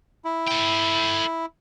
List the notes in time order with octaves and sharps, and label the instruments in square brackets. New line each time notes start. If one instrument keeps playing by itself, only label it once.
[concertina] E4
[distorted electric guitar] A4 G5